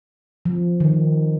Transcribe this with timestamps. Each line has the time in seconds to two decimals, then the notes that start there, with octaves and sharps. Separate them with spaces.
0.46 F3
0.80 D#3